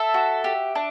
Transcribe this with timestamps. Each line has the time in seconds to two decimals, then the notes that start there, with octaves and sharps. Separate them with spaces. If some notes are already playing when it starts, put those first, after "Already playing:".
Already playing: A4 E5
0.14 F#4
0.44 G4
0.75 D4